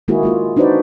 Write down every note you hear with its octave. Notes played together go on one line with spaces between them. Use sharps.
D#3 G#3 A#3 E4 F#4 G#4
G#3 A#3 F4
D4 D#4 F#4 B4 C5 D5